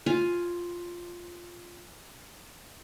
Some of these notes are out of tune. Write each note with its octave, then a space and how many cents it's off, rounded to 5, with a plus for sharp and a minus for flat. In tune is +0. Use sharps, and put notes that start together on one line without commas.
F4 +0 F5 +0 G#5 +0